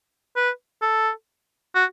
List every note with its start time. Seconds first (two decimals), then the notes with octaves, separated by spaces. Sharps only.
0.36 B4
0.82 A4
1.75 F#4